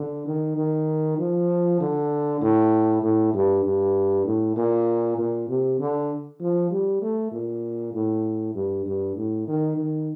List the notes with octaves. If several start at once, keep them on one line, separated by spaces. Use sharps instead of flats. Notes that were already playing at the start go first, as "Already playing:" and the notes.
Already playing: D3
D#3
D#3
F3
D3
A2
A2
G2
G2
A2
A#2
A#2
C3
D3
F3
G3
A3
A#2
A2
G2
G2
A2
D#3
D#3